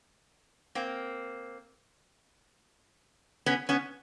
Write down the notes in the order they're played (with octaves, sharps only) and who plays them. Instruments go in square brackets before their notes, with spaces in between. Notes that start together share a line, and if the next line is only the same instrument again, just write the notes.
[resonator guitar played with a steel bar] A#3 C4
B3 C#4
B3 C#4